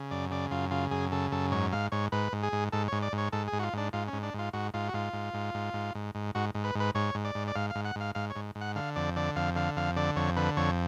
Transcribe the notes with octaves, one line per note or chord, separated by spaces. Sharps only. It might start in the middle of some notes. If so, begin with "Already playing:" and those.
Already playing: C#3
F#2 D5
C#3 D5
F#2 F4
C#3 F4
F#2 G#4
C#3 A4
F#2 A4
G#2 C#5
G#2 F5
G#2 C#5
G#2 B4
G#2
G#4
G#2
G#2 A4
G#2 C#5
D5
G#2
C#5
G#2 A4
G#2 G#4
F#4
F4
G#2 D4
G#2 F4
C#4
G#2
D4
G#2 F4
G#2 F#4
G#2 F4
F#4
G#2 F4
G#2
G#2
G#2
G#2
G#2
G#2
G#2 F#4
G#2
B4
G#2 B4
G#2 C#5
G#2
D5
G#2
D5
G#2 F5
F5
G#2
F#5
G#2 F5
G#2 F5
C#5
G#2
G#2
F#5
D3 F5
F2 D5
D3 D5
F2 F5
D3 F5
F2 F5
D3 D5
F2 C#5
D3 B4
F2 C#5